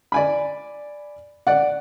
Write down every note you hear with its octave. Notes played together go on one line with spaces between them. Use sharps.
D5 G#5 B5
D5 F#5